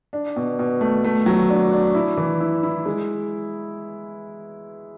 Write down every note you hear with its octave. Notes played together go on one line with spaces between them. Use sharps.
D4
B2
B2
A3
A3
F#3
D4
D4
E4
E3
E4
E4
G#3